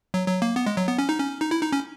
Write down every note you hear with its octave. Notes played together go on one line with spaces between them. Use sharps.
F#3
F#3
A#3
B3
G#3
F#3
B3
C#4
D#4
C#4
D#4
E4
D#4
C#4